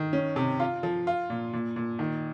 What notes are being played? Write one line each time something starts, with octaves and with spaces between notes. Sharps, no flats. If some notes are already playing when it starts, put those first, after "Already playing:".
Already playing: D#3
C#4
C3
F4
F3
F4
A#2
A#2
A#2
D#3